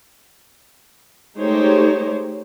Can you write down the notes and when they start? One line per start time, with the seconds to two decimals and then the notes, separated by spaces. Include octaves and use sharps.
1.41 G#3 A3 D#4 G4 C5 C#5